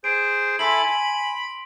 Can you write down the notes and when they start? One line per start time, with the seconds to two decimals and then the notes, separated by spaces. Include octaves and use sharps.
0.04 G#4 C5 D7
0.59 E4 A4 G#5 B5 C6 B6 F#7
0.87 B5